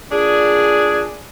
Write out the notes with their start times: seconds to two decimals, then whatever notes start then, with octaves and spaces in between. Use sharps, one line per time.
0.11 A#2 D4 G#4